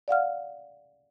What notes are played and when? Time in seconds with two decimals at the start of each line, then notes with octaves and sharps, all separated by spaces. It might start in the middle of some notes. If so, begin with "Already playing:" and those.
0.08 D5 F5 F#5 F6